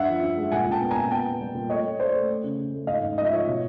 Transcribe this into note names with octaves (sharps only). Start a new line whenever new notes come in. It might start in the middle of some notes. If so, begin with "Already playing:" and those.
Already playing: G2 E5 F#5
F3
G2
G#3
A#2 F#5 G#5
A#2
G5 A5
B3
G#5 A#5
A#2
B3 G5 A5
B3
G3
A#2
A3 C#5 D#5
A3
A3 C5 D5
A3
A3
C#3
C#3
A3
G#2 D#5 F5
G#2
F3 D#5
E5
F3 C#5 D#5
B2